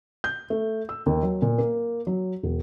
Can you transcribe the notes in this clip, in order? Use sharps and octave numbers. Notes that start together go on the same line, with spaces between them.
G6
A3
E6
D#2
F#3
A#2
A#3
F#3
E1